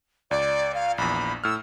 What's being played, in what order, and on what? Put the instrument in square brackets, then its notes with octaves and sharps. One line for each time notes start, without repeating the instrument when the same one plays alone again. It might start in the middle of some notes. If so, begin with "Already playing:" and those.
[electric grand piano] C#2 [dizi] D5
[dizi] F5
[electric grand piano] A#1 E2 [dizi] B5
[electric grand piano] A2 F6 [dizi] E6